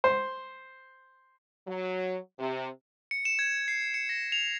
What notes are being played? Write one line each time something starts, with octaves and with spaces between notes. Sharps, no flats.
C5
F#3
C3
C#7
E7
G#6
C7
C#7
A#6
F7